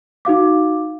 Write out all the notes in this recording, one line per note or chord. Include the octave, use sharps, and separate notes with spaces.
D#4 F#4 F5 D6